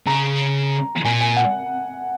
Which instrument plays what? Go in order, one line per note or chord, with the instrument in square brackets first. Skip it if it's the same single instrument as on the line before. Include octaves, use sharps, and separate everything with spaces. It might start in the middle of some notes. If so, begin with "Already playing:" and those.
[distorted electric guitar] C#3 [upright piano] A#5
[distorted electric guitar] A#2 [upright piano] G#5
[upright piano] G#5
F#5